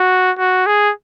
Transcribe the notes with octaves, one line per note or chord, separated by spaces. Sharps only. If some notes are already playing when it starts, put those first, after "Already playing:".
Already playing: F#4
F#4
G#4